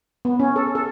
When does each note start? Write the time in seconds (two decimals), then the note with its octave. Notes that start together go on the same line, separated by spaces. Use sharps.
0.25 B3
0.40 C#4
0.56 A4
0.75 A4